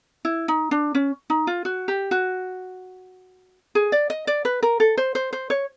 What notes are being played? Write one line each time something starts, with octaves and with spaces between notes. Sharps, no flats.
E4
D#4
D4
C#4
D#4
F4
F#4
G4
F#4
G#4
D5
D#5
D5
B4
A#4
A4
C5
C5
C5
C#5